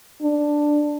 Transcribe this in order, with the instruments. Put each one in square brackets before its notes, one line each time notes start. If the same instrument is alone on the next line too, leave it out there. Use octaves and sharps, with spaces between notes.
[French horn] D4